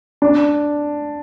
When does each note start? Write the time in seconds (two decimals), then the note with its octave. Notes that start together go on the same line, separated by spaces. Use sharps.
0.22 D4